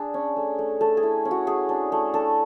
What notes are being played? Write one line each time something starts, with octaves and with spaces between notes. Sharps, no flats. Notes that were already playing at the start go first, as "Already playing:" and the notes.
Already playing: D4 G#4
C#4
A3
A3
A3 A4
G#4
E4
C#4
F#4
A3 G#4
D4
A3
D4 A4